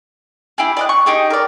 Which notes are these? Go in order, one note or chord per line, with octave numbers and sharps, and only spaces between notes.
E4 G4 G#4
D5 D#5 F#6
C#6
D#4 G4 G#4
A#4 D5